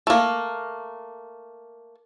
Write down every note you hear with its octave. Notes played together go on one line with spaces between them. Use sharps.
A3 A#3